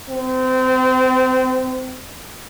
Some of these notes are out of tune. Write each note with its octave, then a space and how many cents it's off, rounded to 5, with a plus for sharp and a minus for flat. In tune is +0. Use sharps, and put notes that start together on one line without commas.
C4 -25